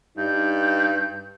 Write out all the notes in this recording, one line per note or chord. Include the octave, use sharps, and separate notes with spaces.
G2 D#4 G6